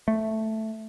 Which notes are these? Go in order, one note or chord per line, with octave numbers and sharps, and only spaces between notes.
A3